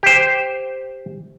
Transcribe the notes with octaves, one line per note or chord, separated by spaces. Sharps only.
G4 C5